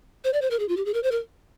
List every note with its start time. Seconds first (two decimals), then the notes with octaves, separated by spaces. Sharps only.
0.24 C5
0.33 D5
0.42 C5
0.51 A#4
0.59 G#4
0.69 F4
0.77 G4
0.85 G#4
0.94 A#4
1.03 C5
1.11 A#4